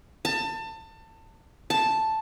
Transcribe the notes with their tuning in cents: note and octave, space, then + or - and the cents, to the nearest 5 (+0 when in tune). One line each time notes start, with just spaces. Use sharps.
A5 +25
A5 +0